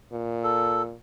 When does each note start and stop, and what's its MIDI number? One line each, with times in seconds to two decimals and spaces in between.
0.12 0.95 46
0.44 0.82 69